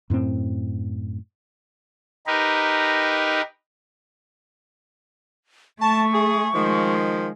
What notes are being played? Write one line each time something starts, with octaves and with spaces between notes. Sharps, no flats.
F#2 A2 B3 C4
D#4 G4 A#4 B4
A3 A5 C#6
G#4
D#3 F3 G#3